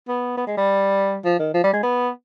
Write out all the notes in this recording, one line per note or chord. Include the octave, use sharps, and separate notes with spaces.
B3
B3
G#3
G3
F3
D#3
F3
G3
G#3
B3